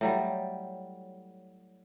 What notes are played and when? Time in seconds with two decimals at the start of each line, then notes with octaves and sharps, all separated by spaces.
0.01 A2 F#3 G3